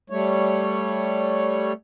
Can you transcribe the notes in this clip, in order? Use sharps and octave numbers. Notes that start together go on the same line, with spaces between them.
G3 A3 C#5